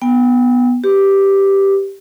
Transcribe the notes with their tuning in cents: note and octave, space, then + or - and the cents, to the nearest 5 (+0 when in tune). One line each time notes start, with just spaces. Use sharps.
B3 -5 G5 +25
G4 +0 B4 +0